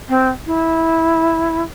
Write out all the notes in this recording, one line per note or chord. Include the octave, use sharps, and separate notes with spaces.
C4
E4